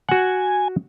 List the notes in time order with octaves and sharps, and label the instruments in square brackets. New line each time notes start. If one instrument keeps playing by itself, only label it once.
[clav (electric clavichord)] F#4 F#5 [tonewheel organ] G#5